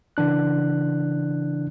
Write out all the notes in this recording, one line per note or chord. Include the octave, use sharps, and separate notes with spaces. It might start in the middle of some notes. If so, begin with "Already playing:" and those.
C#3 E3 D4 F#6